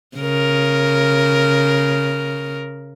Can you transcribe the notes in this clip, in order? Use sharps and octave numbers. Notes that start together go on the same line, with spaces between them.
C#3 A#4